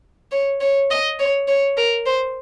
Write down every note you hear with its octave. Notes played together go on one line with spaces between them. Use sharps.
C#5
C#5
D#5
C#5
C#5
A#4
C5